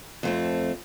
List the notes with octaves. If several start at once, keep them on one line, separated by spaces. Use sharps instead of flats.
F2 A3 C4